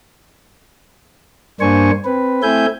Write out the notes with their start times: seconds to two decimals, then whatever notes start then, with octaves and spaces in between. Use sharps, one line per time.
1.61 G2 A#3 D4 C5 G#5 C#6
2.05 C4 B4
2.43 A3 C4 E4 E5 G#5 G6